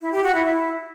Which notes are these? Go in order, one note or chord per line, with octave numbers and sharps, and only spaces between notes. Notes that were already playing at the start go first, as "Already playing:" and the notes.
E4
G4
F#4
E4
E4